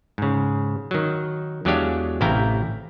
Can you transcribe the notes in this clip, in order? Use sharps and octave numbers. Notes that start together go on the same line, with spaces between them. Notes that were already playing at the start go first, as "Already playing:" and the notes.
G#2 C#3
D#3 F#3
E2 F#3 G#3 D4 G4 F5
A1 C3 E4 F5 G5 A#5